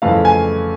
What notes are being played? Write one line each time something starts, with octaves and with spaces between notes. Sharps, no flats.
F2 C#3 E3 A3 F5
G#5